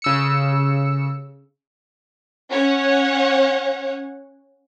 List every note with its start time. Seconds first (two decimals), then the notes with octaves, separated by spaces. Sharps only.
0.02 C#3 E6 C#7
2.50 C#4 C#5 F#5